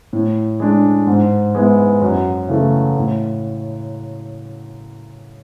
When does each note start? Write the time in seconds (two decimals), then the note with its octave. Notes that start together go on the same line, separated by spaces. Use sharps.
0.13 A2
0.60 G#3 D4
1.07 G#2
1.55 G#3 B3 E4
2.02 F#2
2.49 C#3 E3 A3
2.97 A2